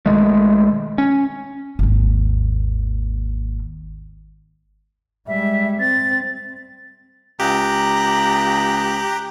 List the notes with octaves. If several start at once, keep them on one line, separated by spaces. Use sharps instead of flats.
B1 D#3 G#3 A3
C#4
G#1 D#2
G3 G#3 E5
C4 A6
C#2 G4 A#5 F#6